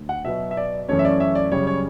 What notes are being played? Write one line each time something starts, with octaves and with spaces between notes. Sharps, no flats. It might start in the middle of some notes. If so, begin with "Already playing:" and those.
Already playing: D2
F#5
B2 F#3 B3 E5
E5
D5
F#2 E3 A3 C#4 C#5
E5
D5
E5
D5
F#2 C#3 G3 C#5
C#5